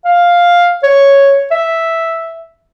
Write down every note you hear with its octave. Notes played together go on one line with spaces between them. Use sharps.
F5
C#5
E5